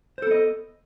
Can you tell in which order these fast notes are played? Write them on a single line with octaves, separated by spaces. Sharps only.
C5 A4 B3 D#5